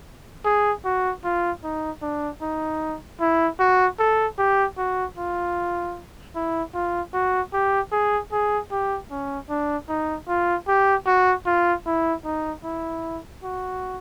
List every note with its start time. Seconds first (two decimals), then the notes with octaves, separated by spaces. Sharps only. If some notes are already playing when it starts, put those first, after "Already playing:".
0.45 G#4
0.85 F#4
1.24 F4
1.63 D#4
2.02 D4
2.42 D#4
3.20 E4
3.59 F#4
3.99 A4
4.38 G4
4.78 F#4
5.18 F4
6.35 E4
6.74 F4
7.14 F#4
7.53 G4
7.92 G#4
8.32 G#4
8.71 G4
9.11 C#4
9.50 D4
9.89 D#4
10.28 F4
10.68 G4
11.07 F#4
11.46 F4
11.86 E4
12.25 D#4
12.64 E4
13.44 F#4